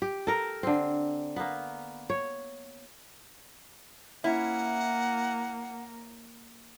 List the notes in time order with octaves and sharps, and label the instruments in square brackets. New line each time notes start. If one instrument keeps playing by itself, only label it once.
[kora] G4
A4 A#4
D3 C4
A#3 B3
C#5
[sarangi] A#3 [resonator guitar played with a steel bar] C#4 E4 [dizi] F#5